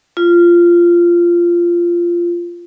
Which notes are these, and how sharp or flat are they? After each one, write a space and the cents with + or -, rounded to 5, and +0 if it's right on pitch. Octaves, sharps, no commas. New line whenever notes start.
F4 -15